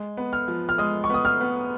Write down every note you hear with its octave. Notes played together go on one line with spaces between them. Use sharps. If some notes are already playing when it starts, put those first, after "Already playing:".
Already playing: G#3
B3
F6
F3
F6
G#3 D#6
C#6
B3 D#6
F6
B3